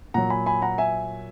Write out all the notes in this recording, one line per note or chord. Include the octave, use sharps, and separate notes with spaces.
A#2 F#3 F#5 A#5
G#5 B5
G#5 B5
F#5 A#5
E5 G#5